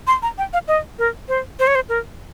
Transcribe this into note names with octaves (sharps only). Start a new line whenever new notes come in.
C6
A#5
G5
F5
D#5
A#4
C5
C5
C#5
C5
A#4